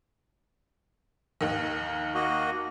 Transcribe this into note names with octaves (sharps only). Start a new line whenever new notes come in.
D#2 D#3
A#3 F#4 D#5